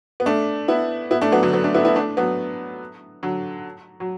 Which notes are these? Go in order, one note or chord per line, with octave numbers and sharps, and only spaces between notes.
B3
A3 D4
B3 E4
B3 E4
A3 D4
F#3 B3
D3 F#3
F#3 B3
A3 D4
B3 E4
B3 E4
A3 D4
F#3 B3
D3 F#3
F#3